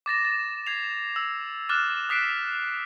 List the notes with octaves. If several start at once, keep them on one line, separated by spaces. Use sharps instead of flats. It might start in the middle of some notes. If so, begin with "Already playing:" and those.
D6 A6 A#6 E7
A6
G#6 C7 F7
E6
D6 F6 F#6 A6 E7
D#6 F#6 B6 C7 D7 E7